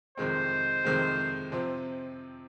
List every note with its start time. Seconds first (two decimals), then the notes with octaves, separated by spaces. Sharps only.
0.17 F2 C3 D#3 G#3 C4 C5
0.85 F2 C3 D#3 G#3 C4
1.52 C3 F3 C4